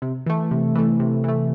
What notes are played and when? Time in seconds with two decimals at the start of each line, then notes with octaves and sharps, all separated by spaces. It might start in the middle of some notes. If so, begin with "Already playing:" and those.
0.02 C3
0.26 E3 A3
0.51 C3
0.75 E3 A3
1.00 C3
1.24 E3 A3